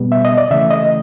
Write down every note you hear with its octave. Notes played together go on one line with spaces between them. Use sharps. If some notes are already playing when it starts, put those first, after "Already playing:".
Already playing: B2 G3 B3
E5
D#5
D5
C#3 E3 A3 E5
D#5